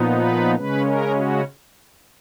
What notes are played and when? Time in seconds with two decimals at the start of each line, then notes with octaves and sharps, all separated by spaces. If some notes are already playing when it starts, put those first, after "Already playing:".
Already playing: A#2 F3 B3 D#4
0.12 B4
0.56 C#3 G#3 C#4 B4
0.85 A#4
1.15 F#4